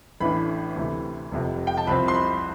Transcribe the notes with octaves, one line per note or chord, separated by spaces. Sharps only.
A1 A2 E3 A3 D4 B5
D2 C3 E3 A3
F1 F2 C3
G5
A5
C2 C3 F3 C4 B5
C6
B5